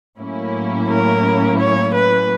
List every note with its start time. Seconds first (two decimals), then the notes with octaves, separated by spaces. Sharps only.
0.18 A2 F#3 A#3 C#4 E4
0.89 A#4
1.60 C#5
1.95 B4